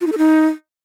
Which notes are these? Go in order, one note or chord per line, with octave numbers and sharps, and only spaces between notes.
F4
D#4
A4
D#4